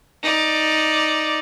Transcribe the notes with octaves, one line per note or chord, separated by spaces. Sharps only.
D#4 D5